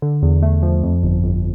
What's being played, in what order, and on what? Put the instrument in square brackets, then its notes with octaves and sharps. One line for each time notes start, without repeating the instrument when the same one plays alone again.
[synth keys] D3
E2
A3
F3
F2
G1
G1